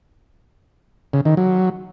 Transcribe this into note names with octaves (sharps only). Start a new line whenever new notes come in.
C#3
D#3
F#3